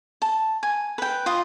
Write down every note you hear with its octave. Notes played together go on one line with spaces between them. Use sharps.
A5
G#5
B4 G5
F4 D#5